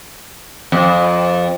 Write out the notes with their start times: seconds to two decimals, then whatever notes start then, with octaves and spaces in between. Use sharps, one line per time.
0.72 F2